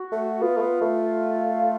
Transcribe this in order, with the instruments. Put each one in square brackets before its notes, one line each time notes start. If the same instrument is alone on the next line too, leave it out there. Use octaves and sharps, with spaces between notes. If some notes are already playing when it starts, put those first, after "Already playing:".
Already playing: [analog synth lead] F#4
[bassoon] A3
[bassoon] B3 [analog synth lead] F4
[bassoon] A3
B3
A3